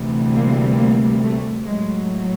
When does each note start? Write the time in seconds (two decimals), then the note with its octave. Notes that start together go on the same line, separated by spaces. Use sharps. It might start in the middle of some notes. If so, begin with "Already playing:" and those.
Already playing: D2 C3 E3 G3
0.35 A#3
0.79 A#3
1.22 A3
1.66 A2 F#3 G#3